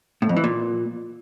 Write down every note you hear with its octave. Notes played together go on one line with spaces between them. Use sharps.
A2
F2
E3
A#2